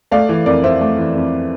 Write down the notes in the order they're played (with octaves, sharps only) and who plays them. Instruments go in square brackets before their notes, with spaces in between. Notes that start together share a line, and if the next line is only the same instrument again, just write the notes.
[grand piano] A3 D5 F5
E3
F2 A#4 D5
F2 C5 E5
A3
E3
F2